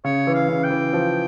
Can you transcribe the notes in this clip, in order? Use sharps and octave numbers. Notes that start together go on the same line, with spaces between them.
C#3 C#5
E3
F5
C#3
G5
E3
F3